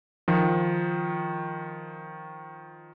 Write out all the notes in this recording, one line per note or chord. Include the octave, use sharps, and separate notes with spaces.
D#3 F3